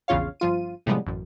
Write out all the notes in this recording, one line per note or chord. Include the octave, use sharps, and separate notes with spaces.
A#1 E2 C#3 F4 C#5 F5
G1 F3 F4 D#7
A2 C3 F3 G3 G#3 B3
A1 F#2